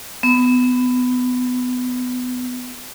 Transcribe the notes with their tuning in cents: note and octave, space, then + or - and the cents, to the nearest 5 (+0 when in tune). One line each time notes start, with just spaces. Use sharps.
B3 +20